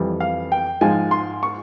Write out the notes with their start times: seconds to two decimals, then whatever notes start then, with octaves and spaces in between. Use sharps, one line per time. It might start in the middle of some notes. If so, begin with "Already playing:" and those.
Already playing: F2 E3 G3
0.20 F5
0.52 G5
0.81 G#2 F3 G#3 G#5
1.11 C6
1.43 C#6